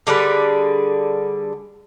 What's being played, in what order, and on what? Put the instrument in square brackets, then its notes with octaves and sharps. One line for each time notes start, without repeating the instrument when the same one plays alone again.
[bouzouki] D3 G3 G#4 B4